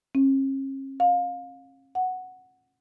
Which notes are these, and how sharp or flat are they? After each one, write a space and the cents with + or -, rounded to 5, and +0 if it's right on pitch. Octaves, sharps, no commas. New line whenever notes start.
C#4 -45
F5 +25
F#5 +0